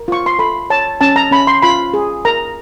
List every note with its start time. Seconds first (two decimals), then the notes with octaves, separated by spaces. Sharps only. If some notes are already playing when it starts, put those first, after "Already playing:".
Already playing: A#4
0.08 F4 C#6
0.26 C6
0.39 A4 B5
0.70 C#5 A5
1.01 C#4 A5
1.16 A#5
1.31 C#4 B5
1.47 C6
1.62 F4 B5
1.94 G#4
2.25 A#4 A#5